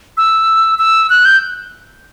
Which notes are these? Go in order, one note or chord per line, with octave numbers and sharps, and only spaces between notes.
E6
E6
F#6
G6